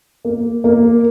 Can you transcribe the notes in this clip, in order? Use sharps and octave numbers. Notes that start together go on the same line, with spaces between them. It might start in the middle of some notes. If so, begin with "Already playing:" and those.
A#3
A#3